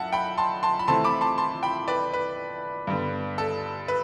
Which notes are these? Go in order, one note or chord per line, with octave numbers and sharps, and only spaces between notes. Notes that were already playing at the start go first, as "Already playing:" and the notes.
Already playing: F#2 E5 F#5 A5
G5 B5
A5 C6
A5 C6
B5
C3 E3 A3 C4 A5 C6
B5 D6
A5 C6
A5 C6
G5 B5
B4 D5
B4
G2 D3 G3 B3
A4
B4